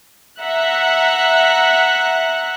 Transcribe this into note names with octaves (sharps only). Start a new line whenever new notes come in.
E5 F#5 A#5 F#6